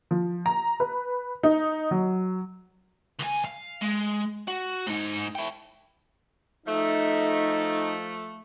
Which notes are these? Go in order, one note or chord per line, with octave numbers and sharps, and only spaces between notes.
F3
A#5
B4
D#4
F#3
C#2 G#5
F5
G#3
F#4
G#2 D#4
E4 G5
F3 A3 D#4